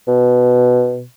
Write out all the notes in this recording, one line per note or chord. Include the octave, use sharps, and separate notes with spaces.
B2